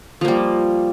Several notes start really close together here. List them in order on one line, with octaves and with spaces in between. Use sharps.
F3 A#3 G3